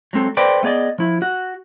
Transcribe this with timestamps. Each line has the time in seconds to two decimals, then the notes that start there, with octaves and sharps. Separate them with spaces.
0.13 F#3 G#3 C4 A4
0.37 A4 B4 C5 D5 G5
0.63 A3 B3 G#4 D5 D#5
0.98 F3 E4
1.22 F#4